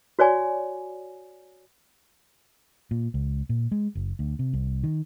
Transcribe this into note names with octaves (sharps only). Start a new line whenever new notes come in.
F#4 C#5 D5 G#5 C#6
A#2
C#2
A#2
G#3
F#1
D2
C3
C2
D#3